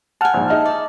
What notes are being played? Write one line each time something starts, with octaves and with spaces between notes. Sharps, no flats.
F#5 G#5 A5 F6
A#1 G#2
D#4 G#4 D#5 E5
D5